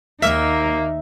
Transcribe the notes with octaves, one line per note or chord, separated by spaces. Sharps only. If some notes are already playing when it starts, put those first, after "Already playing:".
D#2 A#3 D#4 E5